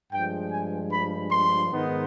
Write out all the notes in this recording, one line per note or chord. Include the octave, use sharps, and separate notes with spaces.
G2 F3 G#3 G5
G#5
B5
C6
G#2 D#3 B3 D#4